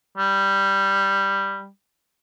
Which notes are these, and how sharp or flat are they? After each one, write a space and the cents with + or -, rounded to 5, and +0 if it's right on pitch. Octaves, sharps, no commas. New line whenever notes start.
G3 +0